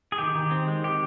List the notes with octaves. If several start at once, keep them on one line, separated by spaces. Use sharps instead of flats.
G#4
D#3 G4
D#3
C4
G#3
D#3 G4